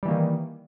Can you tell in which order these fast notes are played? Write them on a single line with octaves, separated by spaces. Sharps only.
G3 E3 A#3 D#3